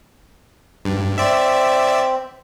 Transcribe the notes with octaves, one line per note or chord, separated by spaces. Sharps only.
G2
C4 D5 E5